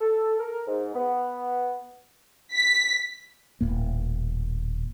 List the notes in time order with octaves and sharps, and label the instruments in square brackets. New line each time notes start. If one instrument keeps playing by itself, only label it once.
[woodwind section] A4
A#4
G#2
B3
[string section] B6
[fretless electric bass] D#1 A2 A#3